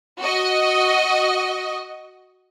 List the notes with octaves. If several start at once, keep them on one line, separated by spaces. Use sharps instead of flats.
F#4 D#5